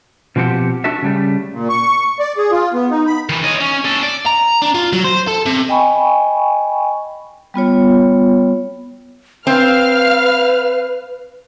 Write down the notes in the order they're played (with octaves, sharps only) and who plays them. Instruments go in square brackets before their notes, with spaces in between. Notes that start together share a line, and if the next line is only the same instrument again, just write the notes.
[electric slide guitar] B2 F3 C4 G4 F#5
D4 F#4 A4 E5
C#3 G3 A3
[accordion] A#2
C#6
D5
G#4
F4
B3
D#4
B5
[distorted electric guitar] D#3 E3
C#5 D#5
C#4
C#4 A4
D5
[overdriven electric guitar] A#5
D4
F4
F#3
C5
A4
C3
[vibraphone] D#5 G5 G#5 B5 C#6
G3 B3 F4 C#5
[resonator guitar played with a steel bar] C4 [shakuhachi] B4 [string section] F5 F6